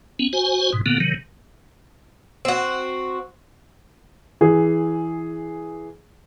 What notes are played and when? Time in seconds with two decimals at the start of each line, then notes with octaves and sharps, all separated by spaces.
0.19 B3 C#4
0.33 F#4 C5 G#5
0.73 G#2 B2
0.86 A#2 D3 A#3 B3
1.00 C3 D#3 F#3
2.45 C4 F#4
4.41 E3 G#4